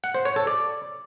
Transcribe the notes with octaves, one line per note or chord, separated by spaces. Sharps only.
F#5
C5
C#5
A4
D5